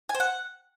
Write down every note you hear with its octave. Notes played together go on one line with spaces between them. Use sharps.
G#5
C5
F#5